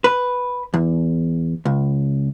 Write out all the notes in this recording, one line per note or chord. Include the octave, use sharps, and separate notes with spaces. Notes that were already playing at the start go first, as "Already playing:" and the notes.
B4
E2
C#2